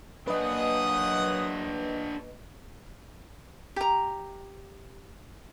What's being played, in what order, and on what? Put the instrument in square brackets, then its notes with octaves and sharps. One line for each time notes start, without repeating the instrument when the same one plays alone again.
[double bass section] F#3 A#3 [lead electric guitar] D4 G#4 [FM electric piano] B4 D#5 [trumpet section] F#5 D#6
[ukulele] G4 A#5